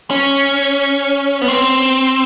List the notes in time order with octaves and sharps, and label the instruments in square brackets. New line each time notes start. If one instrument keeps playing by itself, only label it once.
[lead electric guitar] C#4
B3
C4